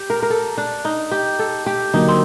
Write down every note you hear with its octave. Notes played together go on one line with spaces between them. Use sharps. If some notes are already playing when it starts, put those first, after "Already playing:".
Already playing: G4
A#4
A#4
A4
D4
D#4
G4
A4
G4
D3 F#3 A#3 D#4
C4